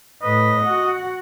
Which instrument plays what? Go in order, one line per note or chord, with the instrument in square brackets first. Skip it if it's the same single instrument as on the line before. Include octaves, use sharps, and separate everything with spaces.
[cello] A2 B4 [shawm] D#5
[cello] F#4 F#5